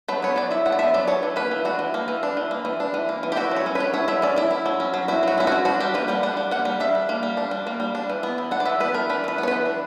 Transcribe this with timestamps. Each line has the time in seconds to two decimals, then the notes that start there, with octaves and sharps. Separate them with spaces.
0.08 F#3 B4
0.22 B3 C#5
0.36 F#3 D5
0.51 E4 E5
0.66 F#3 F#5
0.72 D5
0.79 B3 E5
0.94 F#3 D5
1.07 D4 C#5
1.23 E3
1.36 A#3 B4
1.51 E3
1.65 D4 F#4
1.79 E3
1.94 A#3
2.08 E3
2.23 D4
2.37 E3
2.51 A#3
2.65 E3
2.80 D4
2.94 E3
3.09 A#3
3.23 E3
3.32 G4
3.36 E4 F#4
3.51 F#3
3.56 C#5
3.66 C#4
3.75 B4
3.80 F#3
3.94 E4 C#5
4.08 F#3 E5
4.22 C#4 D5
4.36 F#3 E4
4.51 E4
4.66 F#3
4.80 C#4
4.94 F#3
5.08 E4 F#4
5.23 F#3 F#4
5.38 C#4 E4
5.47 F#3 F#4
5.65 D4 F#4
5.80 G3 G4
5.94 A#3 B4
6.08 G3 F#5
6.23 D4 F#5
6.37 G3
6.51 A#3 F#5
6.65 G3
6.80 D4 E5
6.95 G3
7.09 A#3
7.23 G3
7.37 D4
7.51 G3
7.67 A#3
7.80 G3
7.95 D4
8.10 E3
8.23 B3
8.38 E3
8.51 D4 F#5
8.60 D5
8.66 E3 E5
8.80 B3 B4
8.94 E3 A#4
9.10 D4 B4
9.24 E3 B4
9.38 B3
9.43 C#5
9.48 E3 B4
9.66 D4